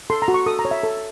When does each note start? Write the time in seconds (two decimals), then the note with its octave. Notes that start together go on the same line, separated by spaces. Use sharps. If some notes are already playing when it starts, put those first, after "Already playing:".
0.10 A4 C6
0.22 A#5
0.28 F#4
0.34 C#6
0.46 A4 D#6
0.59 A#5
0.65 C#5
0.71 E5
0.83 A4